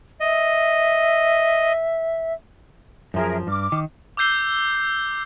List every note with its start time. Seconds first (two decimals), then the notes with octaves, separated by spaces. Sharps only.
0.20 D#5 E5
3.14 F#2 F3 G#4 A#4 E5
3.47 G2 D6 F6
3.72 D#3
4.17 D6 E6 G6 C7 G7